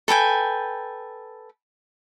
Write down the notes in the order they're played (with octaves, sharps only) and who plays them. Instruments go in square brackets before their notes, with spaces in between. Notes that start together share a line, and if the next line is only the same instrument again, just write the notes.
[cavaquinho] A4 B4 G5 G#5